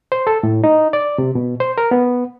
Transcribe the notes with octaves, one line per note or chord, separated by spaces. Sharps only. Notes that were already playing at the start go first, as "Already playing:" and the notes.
C5
A4
A2
D#4
D5
C3
B2
C5
A#4
B3